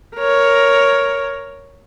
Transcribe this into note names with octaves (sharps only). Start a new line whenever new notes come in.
A#4 C#5